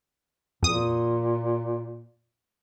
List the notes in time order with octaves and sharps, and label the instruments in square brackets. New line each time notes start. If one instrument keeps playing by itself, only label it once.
[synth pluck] F2 D#6 [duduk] A#2